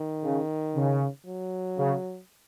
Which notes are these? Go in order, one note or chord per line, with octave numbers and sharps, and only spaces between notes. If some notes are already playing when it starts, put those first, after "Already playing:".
Already playing: D#3
C#3
C#3
F#3
C#3